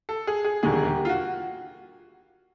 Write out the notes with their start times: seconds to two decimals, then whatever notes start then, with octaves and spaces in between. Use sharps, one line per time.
0.09 A4
0.27 G#4
0.45 G#4
0.63 E1 D#2 D3 G3 G#4
0.86 G4
1.05 F4
1.09 F#4